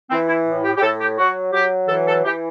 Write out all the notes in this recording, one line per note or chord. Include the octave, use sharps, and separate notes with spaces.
E3 C4
E4
A2
G4
G4
A2 A4
G4
F#3 F#4
F#3 G4
E3 A4
A4
E3 G4